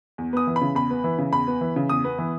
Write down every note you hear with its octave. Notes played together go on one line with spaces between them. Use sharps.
E2
B3 D#6
E3
B5
C#3
E2 B5
B3
E3
C#3
E2 B5
B3
E3
C#3
E2 D#6
B3
E3